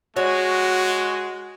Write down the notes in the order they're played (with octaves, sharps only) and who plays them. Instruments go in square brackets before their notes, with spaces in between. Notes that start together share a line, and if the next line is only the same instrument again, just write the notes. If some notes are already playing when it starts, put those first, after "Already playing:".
[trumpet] G#3 [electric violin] F#4 [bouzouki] C#5